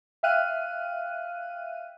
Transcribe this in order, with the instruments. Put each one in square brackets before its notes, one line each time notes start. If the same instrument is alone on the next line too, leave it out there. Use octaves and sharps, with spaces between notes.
[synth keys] E5 F5 G5 F6 F#6 D#7